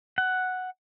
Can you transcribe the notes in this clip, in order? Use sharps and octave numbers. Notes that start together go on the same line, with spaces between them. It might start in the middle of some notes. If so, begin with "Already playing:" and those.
F#5